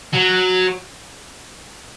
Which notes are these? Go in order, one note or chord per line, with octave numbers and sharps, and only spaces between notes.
F#3